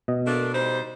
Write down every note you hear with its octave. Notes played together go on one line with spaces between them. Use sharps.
B2 D#5
A3 A#3 D4
G3 D#4 C5